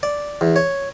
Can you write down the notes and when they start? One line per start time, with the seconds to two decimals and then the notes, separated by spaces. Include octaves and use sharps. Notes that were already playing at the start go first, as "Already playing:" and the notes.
0.03 D5
0.41 E2
0.56 C#5